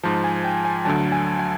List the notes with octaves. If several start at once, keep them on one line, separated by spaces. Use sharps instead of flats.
G#2 F3 A5
G#5
G5
G#5
D2 D3 F#3 A5
G#5
G#5